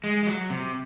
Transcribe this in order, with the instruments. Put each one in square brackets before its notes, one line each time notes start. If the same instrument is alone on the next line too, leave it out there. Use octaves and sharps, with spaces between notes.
[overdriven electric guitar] G#3
G#3
F#3
C3